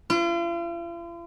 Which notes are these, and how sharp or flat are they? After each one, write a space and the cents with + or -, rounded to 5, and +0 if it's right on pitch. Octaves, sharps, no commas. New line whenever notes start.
F4 -45